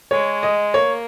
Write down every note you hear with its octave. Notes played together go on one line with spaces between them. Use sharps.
G#3 C#5
D#5
A#3 C#5